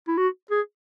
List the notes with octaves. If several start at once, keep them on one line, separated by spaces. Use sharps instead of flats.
E4
F#4
G#4